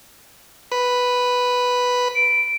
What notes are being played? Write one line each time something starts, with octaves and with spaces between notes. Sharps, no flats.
B4
D7